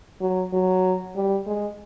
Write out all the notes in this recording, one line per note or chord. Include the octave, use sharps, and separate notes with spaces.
F#3
F#3
G3
G#3